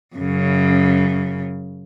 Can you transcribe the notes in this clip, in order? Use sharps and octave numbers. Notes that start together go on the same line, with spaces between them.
F#2 C#3